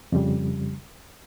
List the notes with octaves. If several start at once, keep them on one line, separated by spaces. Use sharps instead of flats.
F2 C#3 G3